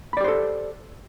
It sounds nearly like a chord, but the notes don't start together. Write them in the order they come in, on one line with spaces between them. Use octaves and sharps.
B5 D5 G4 C5 A4